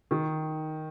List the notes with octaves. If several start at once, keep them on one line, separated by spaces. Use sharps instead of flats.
D#3